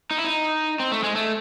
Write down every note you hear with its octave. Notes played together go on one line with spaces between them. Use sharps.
D#4
E4
D#4
C4
A3
G#3
A3